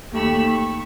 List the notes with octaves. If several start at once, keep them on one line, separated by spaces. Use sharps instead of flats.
D#2 A3 G4 B5 C#6 E6
C#6